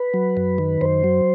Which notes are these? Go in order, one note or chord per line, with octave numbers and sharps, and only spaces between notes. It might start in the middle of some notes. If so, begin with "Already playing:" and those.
Already playing: B4
F#3
F#2
D#3
F#2 C5
F#3